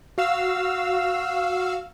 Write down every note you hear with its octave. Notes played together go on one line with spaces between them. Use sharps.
F#4 F5 E6